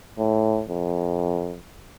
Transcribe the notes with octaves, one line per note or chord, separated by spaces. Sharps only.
A2
F2